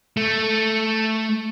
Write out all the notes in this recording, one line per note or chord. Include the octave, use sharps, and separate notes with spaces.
A3